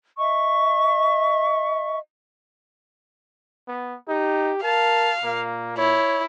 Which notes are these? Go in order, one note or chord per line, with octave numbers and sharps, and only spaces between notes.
D#5 E5 C#6
B3
D#4 G4
A#4 F5 A5
A#2 A#3
E4 C#5